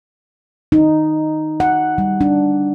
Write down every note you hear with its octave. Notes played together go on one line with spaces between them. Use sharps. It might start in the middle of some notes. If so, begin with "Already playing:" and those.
D#4
F#5
G3
D4